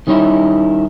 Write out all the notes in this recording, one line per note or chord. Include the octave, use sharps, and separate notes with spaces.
D#3 G3 C#4 D#4 E4